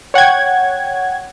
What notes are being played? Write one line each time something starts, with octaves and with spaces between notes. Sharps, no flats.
C#5 F#5 G5 G#6